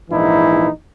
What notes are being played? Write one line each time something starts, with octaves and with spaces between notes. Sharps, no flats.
A#1 G#2 E3 D#4 E4